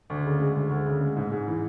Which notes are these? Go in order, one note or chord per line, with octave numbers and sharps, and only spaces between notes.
D2
C#3
G#3
D2
D2
C#3
G#3
G#2
G#2
E3